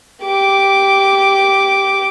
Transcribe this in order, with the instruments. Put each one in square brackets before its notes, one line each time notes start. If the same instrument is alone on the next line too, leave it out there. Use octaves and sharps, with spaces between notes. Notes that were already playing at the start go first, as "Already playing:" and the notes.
[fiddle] G4 D6